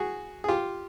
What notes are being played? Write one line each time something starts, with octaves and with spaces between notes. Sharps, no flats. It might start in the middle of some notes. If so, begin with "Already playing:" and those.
Already playing: F#4 G#4
G#4
F4 G4